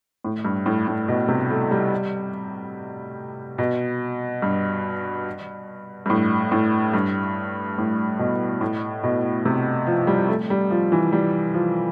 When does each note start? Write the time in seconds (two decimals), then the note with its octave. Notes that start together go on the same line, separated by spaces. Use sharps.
0.24 A2
0.45 G2
0.66 A2
0.88 A2
1.08 B2
1.28 C3
1.50 A3
1.71 G3
3.58 B2
4.42 G2
6.06 G2
6.10 A2
6.52 A2
6.94 G2
7.78 A2
8.19 B2
8.61 A2
9.03 B2
9.45 C3
9.87 F3
10.07 G3
10.28 A3
10.50 G3
10.71 F3
10.92 E3
11.13 G3
11.54 F3